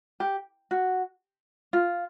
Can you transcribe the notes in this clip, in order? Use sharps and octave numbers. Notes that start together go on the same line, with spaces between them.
G4
F#4
F4